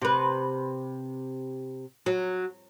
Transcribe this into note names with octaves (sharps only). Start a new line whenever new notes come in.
C3 B4
F#3